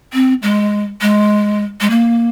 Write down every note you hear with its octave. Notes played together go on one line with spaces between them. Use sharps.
C4
G#3
G#3
G#3
A#3